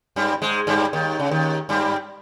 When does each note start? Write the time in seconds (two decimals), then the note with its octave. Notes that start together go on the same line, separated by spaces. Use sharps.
0.16 G2 G3
0.42 G#2 G#3
0.67 G2 G3
0.93 D#2 D#3
1.19 C#3
1.31 D#2 D#3
1.69 G2 G3